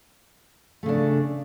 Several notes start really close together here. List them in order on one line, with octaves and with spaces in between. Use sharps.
A3 C#3 D4